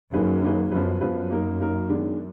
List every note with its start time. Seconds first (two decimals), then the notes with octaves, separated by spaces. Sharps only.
0.13 F#2 D#3 A#3 D#4 G#4 B4
0.42 D#3 A#3 D#4 G#4 B4
0.71 F#2 F3 B3 F4 B4
1.01 F#2 F3 B3 F4 B4
1.30 A#3 D#4 A#4
1.60 A#3 D#4 A#4
1.89 D#3 G#3 B3 D4